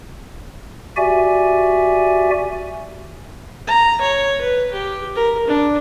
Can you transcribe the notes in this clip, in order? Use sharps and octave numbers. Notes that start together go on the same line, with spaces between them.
F#4 G4 D5 E5 G#5
A#5
C#5
B4
G4
A#4
D4